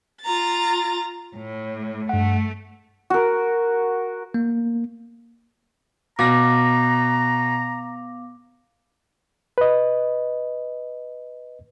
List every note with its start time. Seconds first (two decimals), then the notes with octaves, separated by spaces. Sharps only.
0.22 F4 A#5 A6
1.37 A2
2.09 G2 A3 F#5
3.10 F#4 A#4
4.34 A#3
6.19 B2 B3 F5 A#5 D6 A#6
9.58 B4 D#5